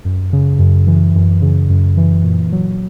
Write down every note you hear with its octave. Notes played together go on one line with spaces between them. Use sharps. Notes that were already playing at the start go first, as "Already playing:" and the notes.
F#2
C#3
F#2
E3
F#2
C#3
F#2
E3
A#2
F#3